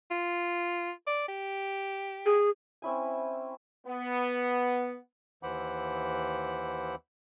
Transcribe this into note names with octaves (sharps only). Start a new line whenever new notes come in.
F4
D5
G4
G#4
C4 C#4 E4 G#5
B3
D#2 E3 C5 F#5 B5 D6